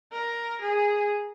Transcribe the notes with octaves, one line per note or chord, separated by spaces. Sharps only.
A#4
G#4